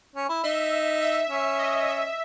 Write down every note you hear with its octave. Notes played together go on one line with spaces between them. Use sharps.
C#4
E4
D#4 E5
E5
C#4
D#5
E5